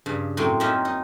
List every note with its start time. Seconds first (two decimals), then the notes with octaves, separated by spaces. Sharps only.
0.06 G2 C#3
0.37 F#2 A2 F#3 C4
0.60 A#3 C4 C#4 D#4 E5
0.85 D#4